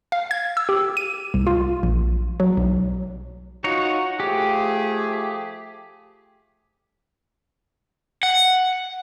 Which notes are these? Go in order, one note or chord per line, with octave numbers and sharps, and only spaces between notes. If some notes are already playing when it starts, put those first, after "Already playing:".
F5
G#6
E6
G4
D#7
C2
F4
A#1
F#3
B1
D#4 F4 F#4 C#5
F3 A3 G4 G#4
F#5